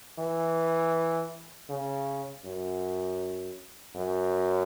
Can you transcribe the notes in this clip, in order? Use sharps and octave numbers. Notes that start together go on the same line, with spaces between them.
E3
C#3
F#2
F#2